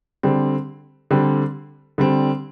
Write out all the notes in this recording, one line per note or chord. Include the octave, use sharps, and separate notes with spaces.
D3 G3 C4
D3 G3 C4
D3 G3 C4